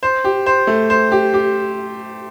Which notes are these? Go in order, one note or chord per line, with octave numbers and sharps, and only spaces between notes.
C5
G4
C5
A3
C5
G4
G4